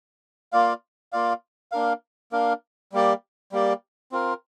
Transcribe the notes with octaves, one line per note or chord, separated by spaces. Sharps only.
A#3 F4 D5 F5
A#3 F4 D5 F5
A#3 D4 A#4 F5
A#3 D4 A#4 F5
G3 A#3 G4 D5
G3 A#3 G4 D5
C4 F4 A#4